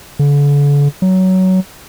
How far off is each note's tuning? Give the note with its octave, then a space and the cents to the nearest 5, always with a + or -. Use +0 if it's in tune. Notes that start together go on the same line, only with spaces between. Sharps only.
D3 -40
F#3 +15